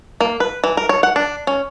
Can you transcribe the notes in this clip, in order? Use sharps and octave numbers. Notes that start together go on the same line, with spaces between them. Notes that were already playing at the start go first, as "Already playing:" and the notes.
A#3
B4
E3
A#4
C#5
F#5
D4
C#4